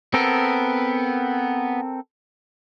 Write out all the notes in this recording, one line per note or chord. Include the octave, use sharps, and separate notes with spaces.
B3 C4 A4 A#4